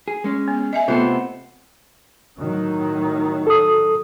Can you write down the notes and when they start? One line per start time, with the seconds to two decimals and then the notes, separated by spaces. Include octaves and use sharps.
0.08 G#4
0.24 G#3 C#4
0.48 B3
0.73 D#5 E5 G#5
0.88 C3 A3 B3 C4 F4 A4 C5
2.39 A2 D#3 F#3
3.47 A4 D#6